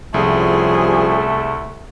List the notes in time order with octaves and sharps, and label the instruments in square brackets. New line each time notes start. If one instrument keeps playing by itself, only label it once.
[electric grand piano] C2 [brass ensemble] F3 G3 C#4 [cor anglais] A3 [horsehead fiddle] G#4